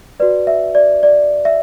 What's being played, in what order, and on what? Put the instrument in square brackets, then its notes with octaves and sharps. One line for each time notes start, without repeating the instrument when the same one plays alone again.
[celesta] F#4 B4 D5
E5
D5
D5
E5